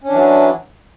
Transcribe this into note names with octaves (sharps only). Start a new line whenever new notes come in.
E3 F#3 C#4 D4